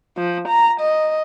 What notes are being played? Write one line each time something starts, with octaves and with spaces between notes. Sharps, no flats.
F3
A#5
D#5